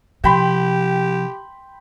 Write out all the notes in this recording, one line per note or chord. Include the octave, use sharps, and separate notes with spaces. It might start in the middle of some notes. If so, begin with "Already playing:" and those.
C3 F3 G4 G5 B5 C6